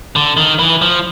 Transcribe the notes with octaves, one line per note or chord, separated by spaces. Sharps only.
D3
D#3
E3
F3